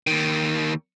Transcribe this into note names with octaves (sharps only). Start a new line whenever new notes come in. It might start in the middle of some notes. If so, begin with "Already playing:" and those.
D#2 D#3